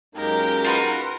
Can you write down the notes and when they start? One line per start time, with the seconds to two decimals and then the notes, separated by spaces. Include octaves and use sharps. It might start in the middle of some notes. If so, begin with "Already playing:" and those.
0.15 F#2 G#3 A#3 D#4 G4 A#4
0.64 F4 F#4 A#4 B4